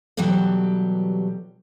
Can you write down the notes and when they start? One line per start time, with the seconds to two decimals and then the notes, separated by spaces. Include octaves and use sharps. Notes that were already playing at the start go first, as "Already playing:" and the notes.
0.17 B2 E3 F#3 G3 G4 A4